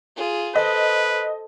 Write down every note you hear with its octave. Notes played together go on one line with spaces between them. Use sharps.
F4 G#4
A4 B4 C5 D#5